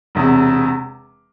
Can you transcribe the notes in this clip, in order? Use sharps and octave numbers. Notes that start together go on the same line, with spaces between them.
E1 E2 C3